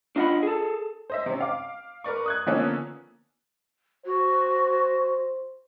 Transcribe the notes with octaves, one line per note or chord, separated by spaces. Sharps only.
D4 F4 D#5 F#5 B5
G#4 A4
C5 D#5 E5
C3 C#4
F5 D6
A#4 B4 D5 C#6
D#6 F#6 G#6
D3 F3 A#3 B3 C#4
F#4 C5